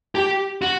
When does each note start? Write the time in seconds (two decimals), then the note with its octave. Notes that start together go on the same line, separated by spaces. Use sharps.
0.15 G4
0.62 F#4